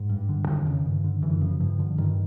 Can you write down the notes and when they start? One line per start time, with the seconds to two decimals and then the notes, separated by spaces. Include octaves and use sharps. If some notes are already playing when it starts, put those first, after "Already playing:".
Already playing: G#2
0.10 G2
0.29 D3
0.47 F2 D#3
0.67 C#3
0.85 G2
1.04 D3
1.22 F#2 E3
1.41 C#3 F3
1.60 G2 F3
1.79 D3
1.98 G2 D#3